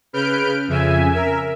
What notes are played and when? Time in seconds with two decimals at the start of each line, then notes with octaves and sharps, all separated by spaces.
0.13 C#3 B4 F6 G6 D7
0.68 F2 C#3 E5 G#5
1.12 A#4 E5